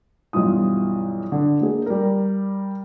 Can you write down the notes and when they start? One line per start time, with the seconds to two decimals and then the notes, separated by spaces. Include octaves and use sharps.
0.33 B1 G2 E3 F4 D#6
1.32 D3
1.61 A#3 G#4
1.86 G3 A#4